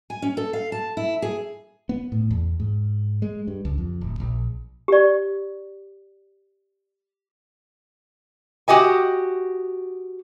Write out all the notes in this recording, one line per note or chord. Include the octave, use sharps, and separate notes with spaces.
G#5
C#4
A4
F5
A5
E4
G#4
B3
A2
E2
G#2
G#3
G2
C#2
F2
D1
A#1
G4 D5
F#4 G4 D#5 G#5